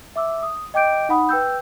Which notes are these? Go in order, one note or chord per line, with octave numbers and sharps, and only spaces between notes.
E5 D6 E6
D#6
D#5 G5 D6 G6 D7
D#4 F#5 B5 D#6
B4 G5 E6 G6